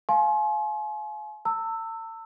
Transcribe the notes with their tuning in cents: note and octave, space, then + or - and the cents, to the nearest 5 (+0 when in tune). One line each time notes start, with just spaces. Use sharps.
F5 +0 G#5 +40 C6 +30
A5 +45 E6 +0